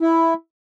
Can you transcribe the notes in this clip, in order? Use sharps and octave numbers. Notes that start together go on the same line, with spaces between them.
E4